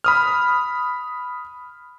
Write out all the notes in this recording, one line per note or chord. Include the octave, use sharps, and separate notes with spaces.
B5 D#6 F6